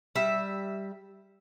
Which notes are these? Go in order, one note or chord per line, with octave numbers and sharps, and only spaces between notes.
G3 E5